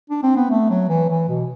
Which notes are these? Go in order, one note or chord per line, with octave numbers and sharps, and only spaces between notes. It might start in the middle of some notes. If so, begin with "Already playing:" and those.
D4
C4
B3
A3
F#3
E3
E3
B2